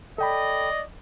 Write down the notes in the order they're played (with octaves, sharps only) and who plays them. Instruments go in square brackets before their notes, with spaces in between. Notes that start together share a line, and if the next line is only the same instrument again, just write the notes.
[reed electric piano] A4 G5 B5 [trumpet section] D5 D#5